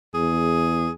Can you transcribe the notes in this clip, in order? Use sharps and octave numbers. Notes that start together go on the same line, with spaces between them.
E2 G#4